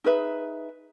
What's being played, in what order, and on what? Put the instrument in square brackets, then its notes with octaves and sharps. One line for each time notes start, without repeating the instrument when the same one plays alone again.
[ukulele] D#4 G#4 B4 E5